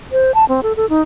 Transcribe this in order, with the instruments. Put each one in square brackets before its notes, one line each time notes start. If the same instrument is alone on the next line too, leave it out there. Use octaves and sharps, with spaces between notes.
[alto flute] C5
A5
C4
A4
A4
D#4